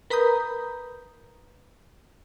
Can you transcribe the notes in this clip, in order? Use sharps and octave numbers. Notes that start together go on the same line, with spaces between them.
A#4 B4 A#5 B5 D#6 G6